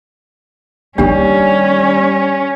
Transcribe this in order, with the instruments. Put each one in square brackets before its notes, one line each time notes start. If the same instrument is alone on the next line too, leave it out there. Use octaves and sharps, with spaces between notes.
[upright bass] D#3 A#3 [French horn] G3 [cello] C#4 [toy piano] D4 G4